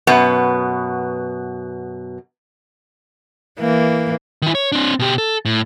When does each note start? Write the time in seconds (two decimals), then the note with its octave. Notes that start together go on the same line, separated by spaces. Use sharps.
0.07 F#2 B2 B3
3.59 E3 A#3
4.42 D#3 E4
4.55 C#5
4.72 C4 D4
4.99 B2 G4
5.18 A4
5.45 A2